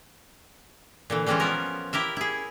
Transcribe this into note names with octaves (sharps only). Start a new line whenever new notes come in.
A#2 D3 E3
E3 G3 G#3 C4 C#4 F4
F3 B3 A#4
E4 G4 A#4 E5
E4 G#4